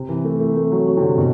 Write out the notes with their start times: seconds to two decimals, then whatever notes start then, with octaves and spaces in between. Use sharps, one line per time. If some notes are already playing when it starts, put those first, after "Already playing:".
Already playing: C3
0.09 E3
0.25 A3
0.40 A3
0.56 A3
0.72 F#3
0.87 F#3
0.97 C3
1.03 D3
1.18 B2